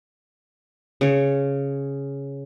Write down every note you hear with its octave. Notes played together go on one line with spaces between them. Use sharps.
C#3 C#5